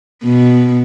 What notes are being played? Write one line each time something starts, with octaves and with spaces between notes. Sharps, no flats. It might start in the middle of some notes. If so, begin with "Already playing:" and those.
B2